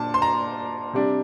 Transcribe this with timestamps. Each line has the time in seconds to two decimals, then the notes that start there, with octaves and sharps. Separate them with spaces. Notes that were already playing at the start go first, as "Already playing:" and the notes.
Already playing: A#2 D4 A5
0.14 C6
0.22 A#5
0.93 C3 G3 D4